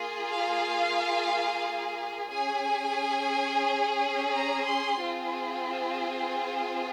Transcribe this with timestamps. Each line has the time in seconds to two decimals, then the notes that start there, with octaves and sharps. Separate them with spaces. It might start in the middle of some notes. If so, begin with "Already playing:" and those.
Already playing: A#3 F4 G#4
0.29 F5
2.31 C#4 G#4 G#5
4.33 A#5
4.67 C6
5.00 C4 F4 G#4